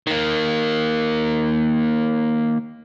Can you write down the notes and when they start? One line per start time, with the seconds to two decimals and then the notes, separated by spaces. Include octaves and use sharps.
0.07 D#3 A#3